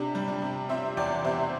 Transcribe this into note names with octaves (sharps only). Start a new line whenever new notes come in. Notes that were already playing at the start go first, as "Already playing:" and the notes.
Already playing: C3 D4 G4
G3
D4
C3
C4 C5 E5
E2 D5 G5
C3 C5 E5